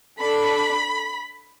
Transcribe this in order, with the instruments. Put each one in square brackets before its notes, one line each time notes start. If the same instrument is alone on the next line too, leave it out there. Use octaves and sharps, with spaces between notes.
[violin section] D4 A4 B5